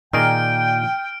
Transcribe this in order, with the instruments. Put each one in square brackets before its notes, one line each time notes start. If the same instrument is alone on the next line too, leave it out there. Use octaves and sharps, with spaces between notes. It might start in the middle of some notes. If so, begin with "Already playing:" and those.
[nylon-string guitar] A#2 D5 [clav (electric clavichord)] D#3 G#4 A#4 [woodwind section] G5 [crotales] F6 D7